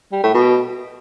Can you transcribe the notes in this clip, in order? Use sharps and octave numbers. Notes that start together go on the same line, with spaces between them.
G3
A2
B2